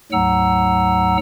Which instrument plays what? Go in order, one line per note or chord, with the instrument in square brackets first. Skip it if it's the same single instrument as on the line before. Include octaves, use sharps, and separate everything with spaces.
[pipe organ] D2 G#2 F#3 F#5 A#5 E6